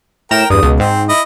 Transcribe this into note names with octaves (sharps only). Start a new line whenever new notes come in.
A2 A#4 G5 A#5 E7
E2 G2 D#6
C#2 B2
G#2 C4
E4 D#5